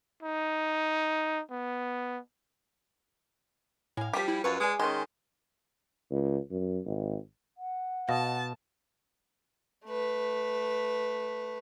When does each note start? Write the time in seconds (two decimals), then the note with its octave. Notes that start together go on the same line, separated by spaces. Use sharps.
0.23 D#4
1.51 B3
3.97 A2 F5 G#5
4.13 F3 G3 G4 B6
4.28 E4
4.44 F#2 F4 B4 A#5 C#6
4.60 G#3 G#4 D5 D#6
4.79 D#3 G#3 C#4 C6
6.11 C#2
6.51 F#2
6.86 G#1
7.58 F#5
8.09 B2 D#5 F5 A5
9.86 A3 B4